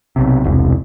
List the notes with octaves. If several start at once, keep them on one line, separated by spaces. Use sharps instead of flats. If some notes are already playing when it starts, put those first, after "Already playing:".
B1 C3
E1 C2